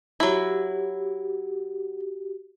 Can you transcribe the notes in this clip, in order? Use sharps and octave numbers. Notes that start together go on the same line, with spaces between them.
F#3 E4 F#4 G4